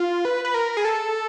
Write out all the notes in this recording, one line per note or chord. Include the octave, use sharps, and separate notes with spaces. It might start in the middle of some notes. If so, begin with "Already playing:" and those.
Already playing: F4
B4
B4
A#4
G#4
A4